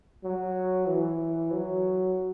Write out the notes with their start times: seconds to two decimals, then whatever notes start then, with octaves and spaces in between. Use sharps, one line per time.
0.24 F#3
0.88 E3
1.51 F#3